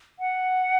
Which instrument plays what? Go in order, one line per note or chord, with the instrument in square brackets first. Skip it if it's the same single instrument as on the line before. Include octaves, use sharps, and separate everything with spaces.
[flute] F#5